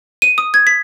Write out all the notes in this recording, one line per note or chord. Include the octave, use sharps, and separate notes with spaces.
D#7
D#6
G#6
B6